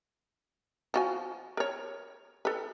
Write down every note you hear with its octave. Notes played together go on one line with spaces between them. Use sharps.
F3 F#4 G#5
A#4 C#5
A4 B4